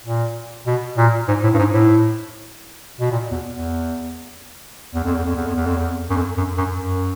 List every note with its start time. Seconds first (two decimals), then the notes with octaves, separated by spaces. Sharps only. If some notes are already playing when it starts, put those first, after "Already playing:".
0.06 A#2
0.67 B2
0.97 A#2
1.28 G#2
1.44 A2
1.54 G2
1.58 G#2
1.73 A2
3.00 B2
3.12 A#2
3.31 E2
3.52 E2
4.94 E2
5.04 F2
5.15 E2
5.25 F2
5.36 E2
5.46 F2
5.56 E2
5.66 F2
5.77 E2
6.10 F#2
6.16 F2
6.37 F#2
6.58 F#2
6.77 F#2